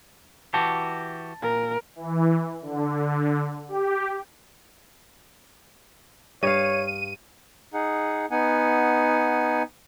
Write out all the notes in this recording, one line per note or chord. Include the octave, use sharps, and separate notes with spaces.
E3 F#4 G4 A5
A#2 A#4
E3
D3
G4
G2 C#5 F5 D#7
D#4 G#4 F#5
B3 D#4 F#5 G#5